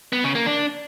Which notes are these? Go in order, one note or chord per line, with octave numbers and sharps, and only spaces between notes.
B3
C#3
A#3
D4